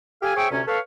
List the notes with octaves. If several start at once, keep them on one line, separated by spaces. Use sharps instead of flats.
G4 A4 F5 G#5
G#4 C5 C#5 E5 G5
D2 C3 C#4
A4 B4 C#5 F5